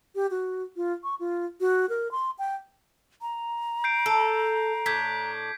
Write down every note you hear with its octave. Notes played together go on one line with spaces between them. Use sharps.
G4
F#4
F4
C#6
F4
F#4
A#4
C6
G5
A#5
G6 C7 D7
A4
A2 D4 G6 G#6 B6